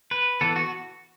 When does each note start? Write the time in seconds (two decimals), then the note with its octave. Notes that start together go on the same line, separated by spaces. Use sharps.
0.11 B4
0.41 E3 B3 A4
0.56 F#4